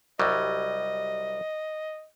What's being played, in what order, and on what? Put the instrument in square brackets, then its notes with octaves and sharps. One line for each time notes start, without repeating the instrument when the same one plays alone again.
[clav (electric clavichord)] C2 F#3 G3 [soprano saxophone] D#5